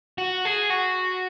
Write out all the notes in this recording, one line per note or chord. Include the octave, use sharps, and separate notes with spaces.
F#4
G#4
F#4